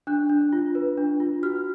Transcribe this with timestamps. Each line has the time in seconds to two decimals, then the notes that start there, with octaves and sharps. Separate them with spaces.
0.07 D4 F#6
0.30 D4
0.53 F4
0.75 B4
0.97 D4
1.20 F4
1.43 F#4 F6